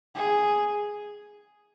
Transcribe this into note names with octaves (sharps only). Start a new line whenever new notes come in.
G#4